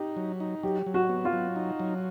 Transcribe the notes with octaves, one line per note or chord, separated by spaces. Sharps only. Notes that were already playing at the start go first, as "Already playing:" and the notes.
Already playing: D#4 G4
F#3
D#4
F#3 G4
F#3
F#4
B3
F4
F#3
D#4
F#3